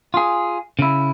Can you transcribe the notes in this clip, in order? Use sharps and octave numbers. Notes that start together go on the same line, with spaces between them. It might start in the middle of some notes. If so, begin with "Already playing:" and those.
F4 G#4
C#3 E4